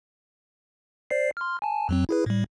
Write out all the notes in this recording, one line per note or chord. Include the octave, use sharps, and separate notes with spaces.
C5 D5 C7
C6 F6
G#5 A5
F2 F#3 C4
E4 G#4 B4
A2 G3